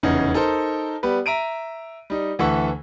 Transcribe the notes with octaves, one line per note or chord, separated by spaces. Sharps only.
F1 E2 C#3 C#4 D#4
D#4 A4 A#4 C5
G3 B3 G4 B4
E5 A#5 D7 D#7
G3 D#4
D2 E3 A4 E5 F#5 C#6